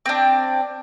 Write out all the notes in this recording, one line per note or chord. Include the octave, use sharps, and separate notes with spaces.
C4 D4